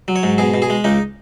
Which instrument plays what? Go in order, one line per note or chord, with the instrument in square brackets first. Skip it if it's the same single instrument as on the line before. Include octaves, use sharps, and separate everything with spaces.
[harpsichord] F#3
C#5
G#2
B2 G#4
B2
G#4
G#3
C#2 D#4